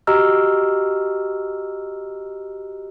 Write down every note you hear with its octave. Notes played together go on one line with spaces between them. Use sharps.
F#4 G4 D#5 A#5 E6 F6